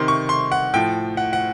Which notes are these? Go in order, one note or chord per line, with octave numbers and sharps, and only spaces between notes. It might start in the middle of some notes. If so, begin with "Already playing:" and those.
Already playing: C3 D#3 C6
C#6
C6
F#5
A2 F3 G5
F#5
F#5